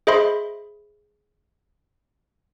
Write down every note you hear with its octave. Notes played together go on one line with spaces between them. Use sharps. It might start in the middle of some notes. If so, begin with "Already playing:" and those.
G#4 C5 D#5 E5 B5 C6